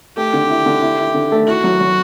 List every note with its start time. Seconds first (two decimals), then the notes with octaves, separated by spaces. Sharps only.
0.17 A3 G4
0.33 D3
0.50 E4
0.66 D3
0.82 E4
0.99 E4
1.14 D3
1.32 A3
1.47 E4 F#4
1.64 F#3
1.80 F#3